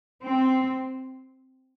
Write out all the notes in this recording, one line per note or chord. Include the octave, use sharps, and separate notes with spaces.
C4